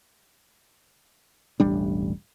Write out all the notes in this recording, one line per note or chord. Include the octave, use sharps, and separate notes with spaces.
E1 A1 G3 D4